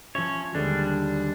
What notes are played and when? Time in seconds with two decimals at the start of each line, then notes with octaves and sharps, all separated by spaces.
0.15 F3 C#4 C#5 E5
0.55 D#2 D3 G3 G#3 D4